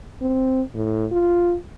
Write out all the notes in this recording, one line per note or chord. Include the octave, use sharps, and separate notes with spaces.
C4
A2
F4